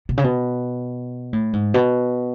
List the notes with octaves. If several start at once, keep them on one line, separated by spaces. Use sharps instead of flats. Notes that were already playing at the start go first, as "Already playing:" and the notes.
B2
C#3
B2
A2
G#2
B2